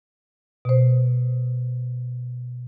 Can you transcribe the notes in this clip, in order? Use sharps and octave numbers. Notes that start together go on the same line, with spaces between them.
B2 C5